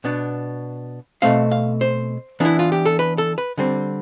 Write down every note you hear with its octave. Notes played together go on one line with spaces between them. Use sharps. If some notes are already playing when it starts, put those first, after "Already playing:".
B2 B3 D4
B2 A3 C4 F5
F5
C5
E3 B3 D4 E4
F4
G4
A4
B4
A4
B4
D3 G3 C4